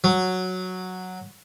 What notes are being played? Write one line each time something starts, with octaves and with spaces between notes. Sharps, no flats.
F#3